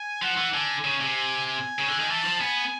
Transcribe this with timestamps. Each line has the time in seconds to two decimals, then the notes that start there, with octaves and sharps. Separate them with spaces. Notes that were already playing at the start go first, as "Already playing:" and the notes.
Already playing: G#5
0.22 F3 F#5
0.37 E3
0.54 D3 G#5
0.84 C#3
1.01 C3
1.16 G#5
1.47 G#5
1.79 C#3
1.89 D3
2.00 D#3
2.10 E3 A5
2.26 F3
2.41 B3 G#5